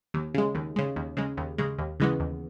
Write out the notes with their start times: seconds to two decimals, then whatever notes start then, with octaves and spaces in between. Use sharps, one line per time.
0.14 D#2
0.34 C#3 G#3
0.55 D#2
0.76 C#3 G#3
0.96 D#2
1.17 C#3 G#3
1.37 D#2
1.58 C#3 G#3
1.79 D#2
2.00 C#3 E3 G#3 B3
2.20 D#2